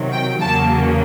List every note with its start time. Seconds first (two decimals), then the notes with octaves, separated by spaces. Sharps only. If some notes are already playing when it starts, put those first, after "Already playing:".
Already playing: C3 D#3 F#3
0.12 G5
0.40 E2 C#3 F#3 A#3 A5